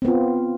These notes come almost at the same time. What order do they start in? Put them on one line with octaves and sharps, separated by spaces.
C4 B3 F4